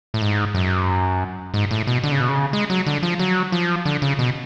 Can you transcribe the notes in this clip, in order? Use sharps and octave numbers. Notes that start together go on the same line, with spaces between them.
A2
G#2
F#2
G#2
A2
B2
D3
C#3
B2
C#3
G#3
F#3
D3
F3
F#3
F3
D3
C#3
B2